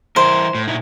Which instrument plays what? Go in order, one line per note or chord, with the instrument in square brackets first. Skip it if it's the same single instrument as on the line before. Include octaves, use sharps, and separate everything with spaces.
[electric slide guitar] E3 E4 A#4 [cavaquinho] C5
[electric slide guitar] A2
A#2 D#4 E4